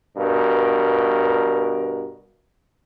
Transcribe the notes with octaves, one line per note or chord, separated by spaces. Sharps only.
G2 B2 A#4